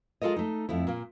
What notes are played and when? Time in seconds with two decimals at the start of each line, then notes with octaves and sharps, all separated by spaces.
0.22 G#3 F4 A4 A#4 D#5
0.36 A3 D#4
0.69 F2 A3 E4
0.87 A#2 A#3